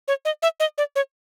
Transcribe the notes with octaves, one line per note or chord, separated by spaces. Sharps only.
C#5
D#5
E5
D#5
D5
C#5